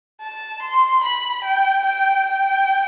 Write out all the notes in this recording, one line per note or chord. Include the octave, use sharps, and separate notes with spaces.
A5
C6
B5
G5
G5
G5